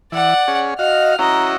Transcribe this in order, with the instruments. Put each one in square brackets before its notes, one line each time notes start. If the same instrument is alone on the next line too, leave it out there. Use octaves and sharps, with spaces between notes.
[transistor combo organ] E3 [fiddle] D5 F#5
[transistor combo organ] C#4 G#4
[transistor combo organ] F#4 F5 [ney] D#5 [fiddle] F6
[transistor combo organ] C#4 E4 F#4 [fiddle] D#5 [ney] A#5